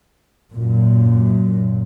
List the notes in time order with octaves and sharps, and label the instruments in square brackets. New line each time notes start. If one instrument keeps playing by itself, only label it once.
[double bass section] F#2 A#2